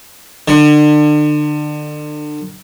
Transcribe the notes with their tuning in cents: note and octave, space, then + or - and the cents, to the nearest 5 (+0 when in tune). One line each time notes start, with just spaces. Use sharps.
D3 +35